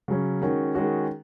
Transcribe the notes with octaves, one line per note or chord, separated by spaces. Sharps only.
C#3 F#3 C#4
D#3 G#3 C#4 F#4
D#3 G#3 C#4 F#4